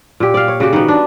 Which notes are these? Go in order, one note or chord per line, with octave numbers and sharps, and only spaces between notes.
A#2 G4
D5 F5
C#5
C#3 F#4 G4
D#3 B3
D4